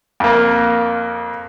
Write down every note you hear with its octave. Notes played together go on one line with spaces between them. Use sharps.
F2 A#3